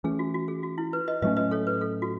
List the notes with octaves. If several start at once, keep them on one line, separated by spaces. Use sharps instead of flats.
E3 A3 C#4 G#4
F#4
F#4
G#4
F#4
E4
B4
B4 D#5
A2 F#3 A3 C#4 B4 D#5
B4 D#5
A4 C#5
B4
A4
F#4